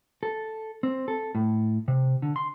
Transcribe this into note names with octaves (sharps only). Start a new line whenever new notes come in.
A4
C4
A4
A2
C3
D3
C6